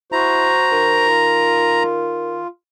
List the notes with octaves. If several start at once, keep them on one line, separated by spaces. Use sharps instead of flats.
E4 F#4 C5 A#5
D#3
F4